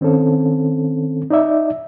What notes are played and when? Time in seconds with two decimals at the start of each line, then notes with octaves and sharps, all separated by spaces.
0.01 D#3 C4 C#4 A4
1.30 D#4 D5 E5